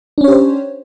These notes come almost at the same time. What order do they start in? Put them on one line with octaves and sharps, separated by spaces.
D4 C#4 C#5 G4 C5